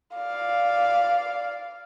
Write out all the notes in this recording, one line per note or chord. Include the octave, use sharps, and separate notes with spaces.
D5 F5